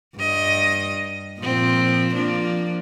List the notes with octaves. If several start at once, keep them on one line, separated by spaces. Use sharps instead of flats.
G2 D#5
A#2 F3 C4
F3 A#3 D4